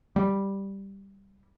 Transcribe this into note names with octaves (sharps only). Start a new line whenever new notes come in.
G3